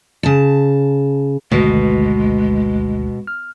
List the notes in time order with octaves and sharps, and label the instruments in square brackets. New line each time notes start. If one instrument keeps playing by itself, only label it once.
[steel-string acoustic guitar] C#3 A5
[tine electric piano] G#1 D2 [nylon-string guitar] B2 [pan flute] G#3
[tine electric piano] F6